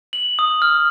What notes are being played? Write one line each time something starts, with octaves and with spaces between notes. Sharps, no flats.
F#7
D#6
F6